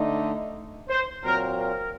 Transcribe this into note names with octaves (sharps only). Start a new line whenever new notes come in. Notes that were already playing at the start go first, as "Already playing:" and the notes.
Already playing: D3 A3 D#4
C5
A#2 F#3 C4 A#4
A#4